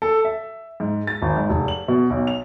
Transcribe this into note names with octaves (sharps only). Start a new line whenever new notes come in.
A4
E5
G#2
A6
G#1
G#2
F1
F#7
B2
B1
F7